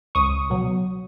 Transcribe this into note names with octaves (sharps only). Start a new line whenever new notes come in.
C#2 C#6 D#6
B2 F#3